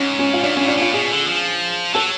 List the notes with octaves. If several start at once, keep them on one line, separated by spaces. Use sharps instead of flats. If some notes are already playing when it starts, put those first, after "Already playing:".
Already playing: G#2 C#4
C#4
F4
F#2 D4
C#4
A2
D4
A2 F4
B2 G#4
D3
F3
F#3 A4